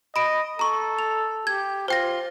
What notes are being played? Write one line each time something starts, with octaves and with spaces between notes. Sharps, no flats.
D#5 B5 D7
A4 A#5 C#6
F7
G4 G#6
F4 C5 G5 A#6